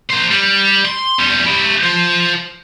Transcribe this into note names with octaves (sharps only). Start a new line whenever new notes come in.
A#3 C5
G3
C6
E2 G3
E4 G4
F4 C5